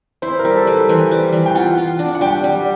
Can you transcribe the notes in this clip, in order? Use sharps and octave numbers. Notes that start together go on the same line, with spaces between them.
E4 C5
A#4
G3
A4
G3 B4
E3 C5
G3
E3
G5
F4 F#5
F4
D4
F#5
G3 G5
G3